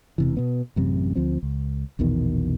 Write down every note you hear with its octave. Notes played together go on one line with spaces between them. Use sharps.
E1 C3 E3
B2 B3
A1 F#2 C3
D2 F3 C4
C#2
A#1 E2 B2 D#3